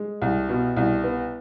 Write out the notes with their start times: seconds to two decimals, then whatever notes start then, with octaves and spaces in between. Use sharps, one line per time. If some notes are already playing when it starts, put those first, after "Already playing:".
Already playing: G#3
0.22 C2
0.49 B2
0.77 C2
1.04 B3